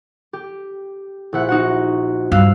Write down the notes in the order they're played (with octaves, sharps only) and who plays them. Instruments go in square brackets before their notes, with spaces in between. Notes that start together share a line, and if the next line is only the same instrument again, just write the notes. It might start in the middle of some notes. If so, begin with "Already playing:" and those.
[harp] G4
A#1 E4 F#5
D#4 F#4 F#5
[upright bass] G2 [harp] F5 E6 F#6